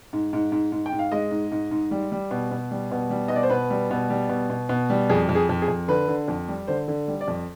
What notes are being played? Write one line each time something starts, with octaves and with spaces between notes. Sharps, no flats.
G#2
G#2
G#2
G#2
G5
G#2
F5
G#3 D#5
G#2
G#2
G#2
G3
G3
B2
B2
G3
B2
G3
B2 D#5
D5
C5
B2 B4
G3
B2
G3
B2
B2
B2
G3
F2 G#4
F2
G#4
F2
G#4
F2
D3 B4
D3
F2
G3
D3 C5
D3
G3
D5
F2